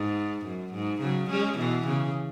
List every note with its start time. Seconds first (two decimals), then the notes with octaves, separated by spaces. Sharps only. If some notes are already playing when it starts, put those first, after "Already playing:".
Already playing: G#2
0.46 F#2
0.74 G#2
1.02 C#3 F#3
1.30 G#3 C#4
1.58 B2 E3
1.87 C#3